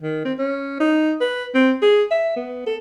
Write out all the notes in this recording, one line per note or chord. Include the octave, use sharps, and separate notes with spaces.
D#3
C4
C#4
D#4
B4
C4
G#4
E5
B3
A4